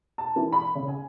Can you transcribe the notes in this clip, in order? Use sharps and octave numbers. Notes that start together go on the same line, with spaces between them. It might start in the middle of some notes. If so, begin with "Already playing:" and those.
A5
E3
B5
C#3
G#5